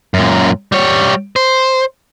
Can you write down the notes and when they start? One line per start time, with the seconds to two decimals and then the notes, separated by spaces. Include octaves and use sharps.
0.14 F#2 A#2
0.72 G3 C#5
1.36 C5